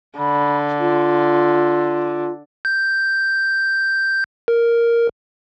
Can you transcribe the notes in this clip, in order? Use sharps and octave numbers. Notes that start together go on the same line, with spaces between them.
D3 B5
F4
G6
A#4